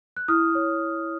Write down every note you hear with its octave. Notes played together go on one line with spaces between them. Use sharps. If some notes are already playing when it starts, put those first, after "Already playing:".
F#6
E4 D#6 F6
C#5